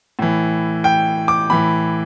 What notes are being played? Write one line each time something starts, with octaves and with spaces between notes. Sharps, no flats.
A2 E3
G5
D6
A2 E3 B5